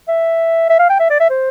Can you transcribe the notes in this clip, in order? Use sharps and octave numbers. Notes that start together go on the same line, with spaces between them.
E5
E5
F5
G5
E5
D5
E5
C5